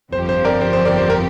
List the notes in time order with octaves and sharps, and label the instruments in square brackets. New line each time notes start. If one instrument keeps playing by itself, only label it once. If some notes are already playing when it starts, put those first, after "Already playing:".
[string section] G1 F2 F3 C4 G4 [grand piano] C5
[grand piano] C5
A#4 D5
C5
C5
A#4 D5
C5
A#4